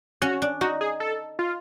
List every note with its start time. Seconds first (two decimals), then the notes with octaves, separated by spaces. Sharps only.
0.22 C#4 F#4
0.42 D4
0.61 D#4 F#4
0.81 G#4
1.00 A4
1.39 F4